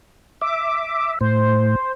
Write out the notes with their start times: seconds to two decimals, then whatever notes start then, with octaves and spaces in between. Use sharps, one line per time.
0.41 E5 D6
1.21 A2 C5